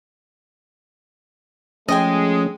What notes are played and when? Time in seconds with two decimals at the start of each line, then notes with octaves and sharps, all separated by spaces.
1.89 F3 G#3 A3 C#4 D#5 G5 G#5